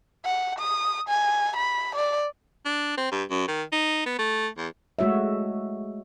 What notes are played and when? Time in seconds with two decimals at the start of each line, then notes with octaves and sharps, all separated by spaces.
0.25 F#5
0.59 D#6
1.09 G#5
1.56 B5
1.95 D5
2.65 D4
2.97 C4
3.12 G2
3.30 F#2
3.48 D#3
3.72 D#4
4.06 B3
4.19 A3
4.58 E2
4.99 G#3 A3 F#4 C#5 E5